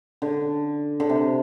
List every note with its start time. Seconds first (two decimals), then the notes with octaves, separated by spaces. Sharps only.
0.22 D3
1.00 D3
1.09 C3